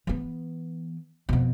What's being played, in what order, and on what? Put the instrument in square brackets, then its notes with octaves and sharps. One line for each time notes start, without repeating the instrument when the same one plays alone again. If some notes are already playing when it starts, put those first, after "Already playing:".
[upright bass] E3 B3
F2 B2